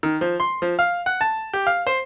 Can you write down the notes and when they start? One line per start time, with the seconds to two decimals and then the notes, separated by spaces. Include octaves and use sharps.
0.03 D#3
0.21 F3
0.40 C6
0.62 F3
0.79 F5
1.06 F#5
1.21 A5
1.53 G4
1.67 F5
1.87 C5